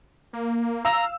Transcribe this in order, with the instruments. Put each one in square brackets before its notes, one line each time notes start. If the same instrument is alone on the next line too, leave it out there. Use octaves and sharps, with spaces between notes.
[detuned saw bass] A#3
[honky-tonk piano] F5 E6 [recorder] A#5